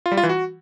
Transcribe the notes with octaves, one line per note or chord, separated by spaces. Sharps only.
F4
G3
F4
E3
F#4